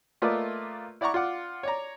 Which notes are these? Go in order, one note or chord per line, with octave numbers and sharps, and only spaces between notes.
A3 A#3 F4 B4 D5 D#5
E4 D5 F#5 A#5 C#6
F4 D5 F#5 D6
C#5 D5 A#5